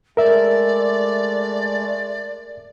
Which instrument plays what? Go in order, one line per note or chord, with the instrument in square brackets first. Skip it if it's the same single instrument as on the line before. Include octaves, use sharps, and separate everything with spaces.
[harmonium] G#3 A3 [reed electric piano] A#4 E5 [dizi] D5